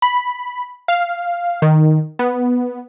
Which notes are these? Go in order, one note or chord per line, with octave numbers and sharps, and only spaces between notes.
B5
F5
D#3
B3